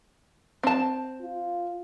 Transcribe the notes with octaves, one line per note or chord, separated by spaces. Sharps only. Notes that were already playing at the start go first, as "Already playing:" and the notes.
C4 A5
F4